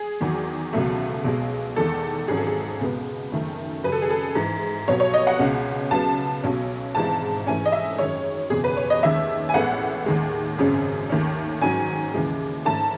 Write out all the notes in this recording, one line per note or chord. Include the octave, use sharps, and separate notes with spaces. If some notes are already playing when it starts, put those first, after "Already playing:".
Already playing: G#4
E2 D#3 F#3
C#2 B2 F#3 A3
B1 B2 G#3
E2 D#3 G#3 A4
G#1 G#2 F#3 C#4 G#4
A4
G#4
C#2 B2 G#3 B3
F#1 F#2 D#3 A3
F#2 C#3 F#3 B4
A4
G#4
A4
G#2 E3 G#3
B1 B2 F#3 B3 C#5
C#5
D#5
F#5
C#2 B2 G#3 C#4
C#2 C#3 F#3 B3 A5
B1 B2 F#3 C#4
G#1 G#2 E3 G#3 A5
G#2 E3 A3 C#4 G#5
D#5
E5
F#2 D#3 G#3 C#5
F#1 E2 B2 G#4
B4
C#5
D#5
D#2 D#3 G#3 C#4 E5
G#5
A1 A2 G#3 B3 F#5
D#2 D#3 G#3
G#1 F#2 C#3 G#3 C#4
D#2 D#3 A3 C#4
G#2 D#3 F#3 C#4 G#5
D#2 C#3 E3 G#3
G#2 D#3 A3 C#4 A5